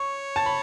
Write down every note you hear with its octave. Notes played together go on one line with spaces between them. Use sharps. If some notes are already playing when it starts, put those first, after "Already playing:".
Already playing: C#5 C#6
A5
B5